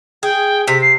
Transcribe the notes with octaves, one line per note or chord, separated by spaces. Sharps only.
G#4 G5
C3 B6
C7